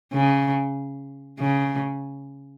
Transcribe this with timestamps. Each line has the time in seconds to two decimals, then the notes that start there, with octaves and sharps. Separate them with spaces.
0.13 C#3
1.40 C#3